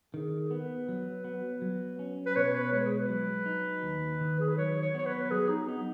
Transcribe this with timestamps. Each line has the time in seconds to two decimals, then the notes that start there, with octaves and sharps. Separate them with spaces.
0.14 D#3 G#4
0.40 G#4
0.51 B3 B4
0.89 F#3
1.24 B3
1.62 F#3
1.99 C#4
2.26 B4
2.36 B2 C#5
2.54 B4
2.72 G#3 C#5
2.84 G#4
2.91 B4
3.09 F#3
3.46 D#4
3.83 D#2
4.21 D#3
4.40 G#4
4.48 B4
4.58 F#3 C#5
4.82 C#5
4.95 B3 C#5
5.06 B4
5.31 F#3 G#4
5.49 D#4
5.68 B3 D#4